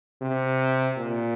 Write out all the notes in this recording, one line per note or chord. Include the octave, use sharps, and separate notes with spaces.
C3
A#2